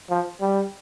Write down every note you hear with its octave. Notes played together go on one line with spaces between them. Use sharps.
F3
G3